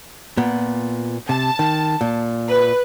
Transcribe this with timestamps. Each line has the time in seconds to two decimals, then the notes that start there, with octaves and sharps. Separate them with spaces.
0.37 A#2 B3
1.29 C3 A5
1.59 D#3
2.01 A#2
2.48 B4